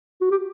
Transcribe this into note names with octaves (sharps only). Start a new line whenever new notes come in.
F#4
G4